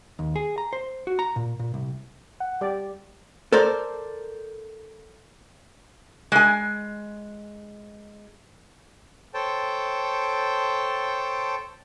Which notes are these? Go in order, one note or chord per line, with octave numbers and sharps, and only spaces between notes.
D#2
G#4
A#5
C5
F#4
A#5
A#2
A#2
C2
F#5
G3 G4 D5
A4 A#4 C5 D5
G#3 G#5
A4 C5 C#5 G5 A5